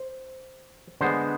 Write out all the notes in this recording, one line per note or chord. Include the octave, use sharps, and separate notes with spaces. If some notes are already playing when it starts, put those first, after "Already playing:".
Already playing: C5
D3 G#3 B3 C5